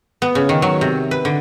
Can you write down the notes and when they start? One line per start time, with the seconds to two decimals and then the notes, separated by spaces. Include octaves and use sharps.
0.22 B3
0.35 C#3
0.49 D#3
0.62 F#3
0.81 C3
1.11 B4
1.25 D3